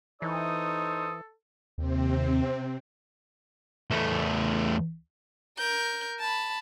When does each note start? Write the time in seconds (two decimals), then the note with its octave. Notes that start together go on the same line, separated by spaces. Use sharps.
0.22 E3 D#4 A4 C5 C#5 D#6
1.78 D#2 C3 C4
3.90 E2 A3
5.59 A#4 G6
6.20 A5 B5